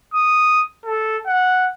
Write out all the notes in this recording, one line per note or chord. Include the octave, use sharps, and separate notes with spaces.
D#6
A4
F#5